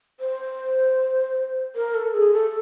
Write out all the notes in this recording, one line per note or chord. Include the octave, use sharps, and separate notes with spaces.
C5
A#4
A4
G#4
A4